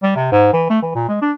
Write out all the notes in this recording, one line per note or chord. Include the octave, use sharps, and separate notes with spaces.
G3
C3
G#2
E3
A3
E3
A#2
G#3
D4